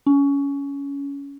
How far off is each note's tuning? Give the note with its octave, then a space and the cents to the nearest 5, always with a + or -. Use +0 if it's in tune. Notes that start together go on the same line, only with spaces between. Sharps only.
C#4 +20